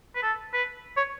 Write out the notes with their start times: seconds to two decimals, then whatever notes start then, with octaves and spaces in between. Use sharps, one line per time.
0.15 B4
0.22 A4
0.53 B4
0.97 C#5